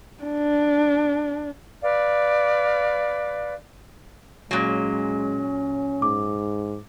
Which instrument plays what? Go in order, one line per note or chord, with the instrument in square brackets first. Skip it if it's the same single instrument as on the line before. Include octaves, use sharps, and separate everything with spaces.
[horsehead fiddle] D4
[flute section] B4 D5 F5
[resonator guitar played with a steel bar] A#2 F#3 [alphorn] G#3 [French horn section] C#4
[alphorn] G#2 [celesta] D6